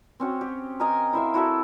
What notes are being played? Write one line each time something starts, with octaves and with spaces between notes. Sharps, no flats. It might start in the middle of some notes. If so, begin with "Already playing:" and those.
C4 C#4 F#4
G4
A#4 D#5 G#5 A#5
E4 C5 E5 F5
E4 F#4 A4 E5